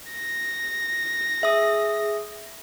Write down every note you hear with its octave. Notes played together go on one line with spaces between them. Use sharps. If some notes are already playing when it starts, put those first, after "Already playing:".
A#6
G#4 E5 D#6